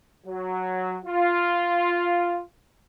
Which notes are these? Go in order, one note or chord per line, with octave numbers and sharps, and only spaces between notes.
F#3
F4